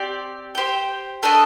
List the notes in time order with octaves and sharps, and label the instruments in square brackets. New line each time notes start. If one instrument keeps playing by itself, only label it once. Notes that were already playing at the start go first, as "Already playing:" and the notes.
Already playing: [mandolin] C4 G4 D5
G4 C5 G5
A3 D4 A4 D#5